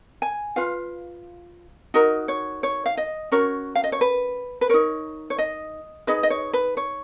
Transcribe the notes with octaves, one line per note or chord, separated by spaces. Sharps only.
G#5
F4 B4 F5
D#4 F#4 A#4 D#5
C#5
C#5
F5
D#5
C#4 F#4 A#4 C#5
F5
D#5
C#5
B4
B4
D#4 A#4 C#5
C#5
D#5
D#4 G#4 B4 D#5
D#5
C#5
B4
C#5